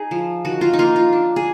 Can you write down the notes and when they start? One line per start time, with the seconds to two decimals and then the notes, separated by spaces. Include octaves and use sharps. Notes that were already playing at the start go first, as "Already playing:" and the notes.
Already playing: D#4 G#4
0.11 F3
0.45 D#3 F#4
0.61 F4
0.73 D#4
0.79 A#3 F4
0.96 F4
1.13 D4
1.36 G#4